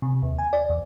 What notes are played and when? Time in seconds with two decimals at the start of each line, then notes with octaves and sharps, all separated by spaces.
0.02 C3
0.22 D#2
0.38 G#5
0.53 D5
0.69 E2